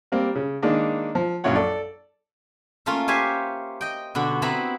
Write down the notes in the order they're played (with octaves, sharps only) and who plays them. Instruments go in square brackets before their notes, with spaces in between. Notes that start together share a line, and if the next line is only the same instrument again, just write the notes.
[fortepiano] G3 A#3 C4
C#3
D#3 G#3 A#3 D4 D#4
F3
A#1 F#2 E4 C#5 F#5
A4 D5
[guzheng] A3 A#3 C#4 F4
G4 C5 C#5 E5 F5 G#5
D#5 G5
B2 D3 F#4
B3 C4 E4 B4 A#5 B5